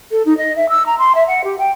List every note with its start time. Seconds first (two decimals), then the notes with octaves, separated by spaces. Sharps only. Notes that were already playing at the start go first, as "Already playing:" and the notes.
0.11 A4
0.25 D#4
0.38 D#5
0.56 E5
0.69 E6
0.86 A#5
0.98 C6
1.15 E5
1.27 F#5
1.44 G4
1.58 G5